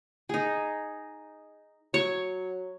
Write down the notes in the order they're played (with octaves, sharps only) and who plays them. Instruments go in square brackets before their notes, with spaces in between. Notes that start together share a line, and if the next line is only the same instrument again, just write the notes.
[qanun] D#4 G#4
[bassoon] F#3 [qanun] C#5